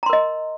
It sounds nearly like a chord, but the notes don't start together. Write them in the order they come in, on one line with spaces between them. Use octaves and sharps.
A#5 C6 A#4 D#5